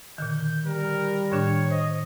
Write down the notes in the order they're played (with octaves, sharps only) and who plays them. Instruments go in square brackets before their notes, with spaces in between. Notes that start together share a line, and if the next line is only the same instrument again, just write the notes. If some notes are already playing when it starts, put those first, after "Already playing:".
[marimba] A#2 D3 D#3 [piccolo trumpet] G6
[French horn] G3 [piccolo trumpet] A#4
[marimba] A2 D#3 D4 [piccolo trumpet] C#5
[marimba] C5 [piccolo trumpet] D#5